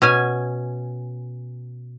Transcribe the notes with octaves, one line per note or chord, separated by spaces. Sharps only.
B2 C#4 G#5